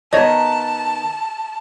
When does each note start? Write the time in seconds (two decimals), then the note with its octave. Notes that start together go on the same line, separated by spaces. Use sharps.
0.13 D#3 B3 A#4 C#5 D#5 A5 G#6